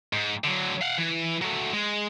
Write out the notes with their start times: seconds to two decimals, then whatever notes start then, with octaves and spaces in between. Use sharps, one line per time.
0.13 G#2
0.44 D3 F#3
0.81 F5 F#5
0.98 E3
1.42 F#3 A3
1.74 G#3